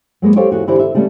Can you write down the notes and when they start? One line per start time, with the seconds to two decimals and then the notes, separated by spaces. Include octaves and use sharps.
0.22 F#3 G#3 A#3 B3
0.36 G4 A4 C5 C#5 F5 G5
0.52 E2 F#4
0.67 D3 E3 E4 G4 A#4 C5
0.79 E5
0.94 C#3 G3 A3 B3 C#4